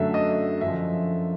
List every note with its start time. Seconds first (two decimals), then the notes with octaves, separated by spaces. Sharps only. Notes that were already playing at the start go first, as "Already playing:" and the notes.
Already playing: F#2 D3 F#3 A3 E5
0.14 D#5
0.61 F#2 D3 F3 E5